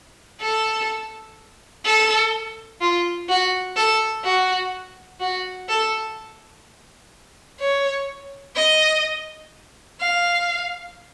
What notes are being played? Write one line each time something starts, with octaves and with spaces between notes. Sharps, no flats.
A4
A4
F4
F#4
A4
F#4
F#4
A4
C#5
D#5
F5